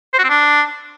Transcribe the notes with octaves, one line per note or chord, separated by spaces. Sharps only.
C5
F#4
C4
D4